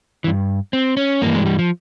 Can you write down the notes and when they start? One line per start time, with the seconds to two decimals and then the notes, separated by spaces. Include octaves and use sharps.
0.24 E3
0.27 G2
0.73 C4
0.97 C#4
1.22 G2 E3 A#3
1.34 G#3
1.46 G3
1.59 F3